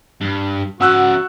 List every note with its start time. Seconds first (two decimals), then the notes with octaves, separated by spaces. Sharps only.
0.21 G2
0.81 C#4 F#4 E5 F#5 E6 F#6